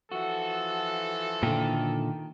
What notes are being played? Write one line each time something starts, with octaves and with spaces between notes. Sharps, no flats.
E3 F3 F#4 A4
A#2 D3 D#3 G5